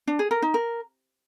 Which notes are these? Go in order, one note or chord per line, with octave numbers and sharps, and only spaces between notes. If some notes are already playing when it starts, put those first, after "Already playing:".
D4
G#4
A#4
D#4
A#4